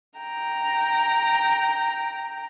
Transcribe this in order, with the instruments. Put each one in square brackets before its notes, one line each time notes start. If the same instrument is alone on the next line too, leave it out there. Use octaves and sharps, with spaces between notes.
[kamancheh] G5 A#5